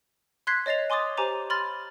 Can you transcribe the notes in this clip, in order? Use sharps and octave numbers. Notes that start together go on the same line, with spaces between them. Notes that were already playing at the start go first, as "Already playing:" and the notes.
C6 F#6 G#6 B6 C7
C#5 D#5 A6 C7 F7
G#5 C6 D6 D#6 A6
G4 C5 G#5 A#5 D6
B5 C6 F6 A6